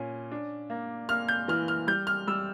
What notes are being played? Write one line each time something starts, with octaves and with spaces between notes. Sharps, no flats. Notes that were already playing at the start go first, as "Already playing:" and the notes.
Already playing: A#2 C#4
D4
A#3
A#3 F6
G6
E3 F6
F6
G3 G6
F6
G3 E6